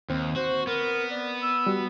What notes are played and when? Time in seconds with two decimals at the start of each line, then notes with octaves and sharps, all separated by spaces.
0.10 D#2 C4
0.36 F#4 C5
0.67 B3 A#4
1.11 D5
1.42 E6
1.66 G3 F#4